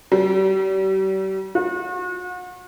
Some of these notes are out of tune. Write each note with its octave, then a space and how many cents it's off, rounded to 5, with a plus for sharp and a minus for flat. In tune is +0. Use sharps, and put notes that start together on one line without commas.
G3 -45
F#4 -40